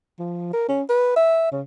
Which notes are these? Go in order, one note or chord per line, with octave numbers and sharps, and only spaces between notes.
F3
A#4
C#4
B4
E5
C#3